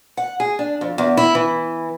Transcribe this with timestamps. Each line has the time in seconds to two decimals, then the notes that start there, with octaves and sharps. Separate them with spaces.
0.17 F#5
0.40 G#4
0.59 D4
0.81 F2
0.98 E2
1.17 E4
1.35 E3